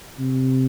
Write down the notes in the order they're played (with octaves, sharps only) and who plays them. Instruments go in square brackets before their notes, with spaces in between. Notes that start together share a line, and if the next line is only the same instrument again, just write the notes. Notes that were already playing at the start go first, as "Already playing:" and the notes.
[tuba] C3